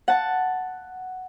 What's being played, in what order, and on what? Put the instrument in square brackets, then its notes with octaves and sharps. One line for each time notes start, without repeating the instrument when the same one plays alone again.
[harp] F#5 A5